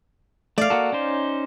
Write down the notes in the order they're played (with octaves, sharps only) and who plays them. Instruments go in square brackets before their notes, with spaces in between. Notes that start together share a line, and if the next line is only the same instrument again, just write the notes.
[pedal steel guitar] A3 [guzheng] D5 F5
[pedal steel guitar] A#3 F#4 A4
C#4 D#4 C5